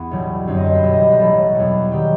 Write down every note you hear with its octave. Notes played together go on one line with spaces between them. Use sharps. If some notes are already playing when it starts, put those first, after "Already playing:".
Already playing: E2 B3
B1 A2 E3 G3
G1 F#2 F#3 C4
D#5
C5
B4
C2 B2 G3 E5
D#5
C5
B4
A1 A2 F#3 A4
E2 B2 G3
D#3 F#3 G4